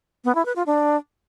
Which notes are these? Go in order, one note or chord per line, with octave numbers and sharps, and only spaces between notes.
B3
E4
B4
F4
D4